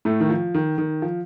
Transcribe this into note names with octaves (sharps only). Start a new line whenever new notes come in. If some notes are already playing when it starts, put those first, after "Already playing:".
A2 A3
D#3
F3
D#3
D#3
F3